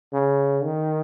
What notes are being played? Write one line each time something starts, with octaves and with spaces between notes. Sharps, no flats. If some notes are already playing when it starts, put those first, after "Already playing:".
C#3
D#3